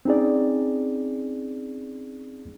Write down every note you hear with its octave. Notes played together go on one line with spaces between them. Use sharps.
C4 C#4 D#4 G#4 D5